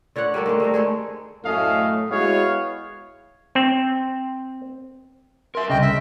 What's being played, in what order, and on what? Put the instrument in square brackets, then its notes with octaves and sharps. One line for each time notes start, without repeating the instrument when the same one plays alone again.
[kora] D3 C#5 D5 F#5
G3 A3 A#3 D4
D#3 G#3 A3
G3 C4 D#4
D3 G#3 A3 G#4
[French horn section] F#2 A2 A3 [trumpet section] C#4 D#5 F5
[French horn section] G#3 E4 F#4 [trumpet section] B3 C#5 F5
[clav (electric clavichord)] C4
[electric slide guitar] A#4 E5 [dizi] C6
[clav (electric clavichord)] C2 C#3 [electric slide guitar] D#5 [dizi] G5
[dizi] E5